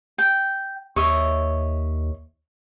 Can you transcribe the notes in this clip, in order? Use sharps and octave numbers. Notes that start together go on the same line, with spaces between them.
G5
D#2 C#5 D#5 E5